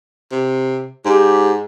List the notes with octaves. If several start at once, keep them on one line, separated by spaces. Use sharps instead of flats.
C3
G#2 G4